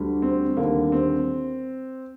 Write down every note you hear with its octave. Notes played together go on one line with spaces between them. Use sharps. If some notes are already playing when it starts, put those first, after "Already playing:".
Already playing: D2 D3 G3
C4
D#2 D3 G3 A#3
C4